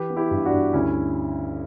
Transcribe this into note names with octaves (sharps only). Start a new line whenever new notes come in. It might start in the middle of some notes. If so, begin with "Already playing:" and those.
Already playing: E3 G4 B4
B3
E4 G4
G2
D4 F#4
G2
D2 C#4 E4